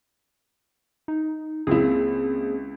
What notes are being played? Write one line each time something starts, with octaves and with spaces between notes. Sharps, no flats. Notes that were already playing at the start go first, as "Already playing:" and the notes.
D#4
C#2 A#3 C4 E4 G#4